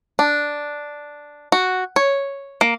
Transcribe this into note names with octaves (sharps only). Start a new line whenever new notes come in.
D4
F#4
C#5
A#3